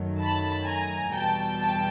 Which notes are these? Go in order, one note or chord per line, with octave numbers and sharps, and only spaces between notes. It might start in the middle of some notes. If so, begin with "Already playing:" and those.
Already playing: F#2 D#3 F#3 A3
A5 B5
G#5 A#5
E2 B2 G3 G5 A5
G5 A5